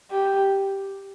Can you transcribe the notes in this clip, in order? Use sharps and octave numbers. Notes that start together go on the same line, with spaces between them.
G4